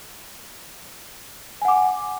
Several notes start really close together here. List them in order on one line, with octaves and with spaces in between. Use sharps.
G#5 F#5 D6